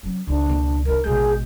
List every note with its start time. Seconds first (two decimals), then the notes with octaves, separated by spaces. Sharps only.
0.03 F#3 C#4
0.27 C#2 D4 D#4
0.46 B2 A#3
0.85 D#3 D4 A#4
1.04 A1 B2 G#3 G#4 G6